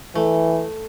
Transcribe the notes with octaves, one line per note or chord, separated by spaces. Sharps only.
E3 A3